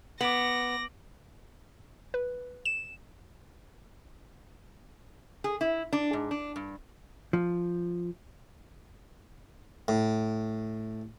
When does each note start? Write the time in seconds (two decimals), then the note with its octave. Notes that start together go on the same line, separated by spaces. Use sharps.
0.21 B3 D6 A#6 D7 F#7
2.14 B4
2.65 E7
5.44 G#4
5.61 E4
5.93 D4
6.13 G#2
6.31 D4
6.56 G2
7.33 F3
9.88 A2